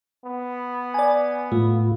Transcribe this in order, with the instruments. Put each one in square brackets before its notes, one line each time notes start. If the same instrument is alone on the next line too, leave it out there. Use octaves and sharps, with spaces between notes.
[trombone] B3
[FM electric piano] D5 G#5
[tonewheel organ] A2 F4 [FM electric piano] A3